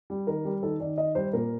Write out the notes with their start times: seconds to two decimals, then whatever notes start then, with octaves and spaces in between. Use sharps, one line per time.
0.10 G3
0.27 D#3 A#4
0.45 G3
0.63 D#3 A4
0.80 D#3 D5
0.98 D#3 D#5
1.15 G3 C5
1.33 A#2 A#4